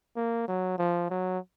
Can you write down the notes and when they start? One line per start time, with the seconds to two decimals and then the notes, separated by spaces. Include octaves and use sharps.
0.16 A#3
0.48 F#3
0.78 F3
1.10 F#3